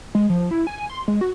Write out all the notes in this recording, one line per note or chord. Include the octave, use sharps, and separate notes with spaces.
G#3
F3
E4
G#5
C6
G#3
F#4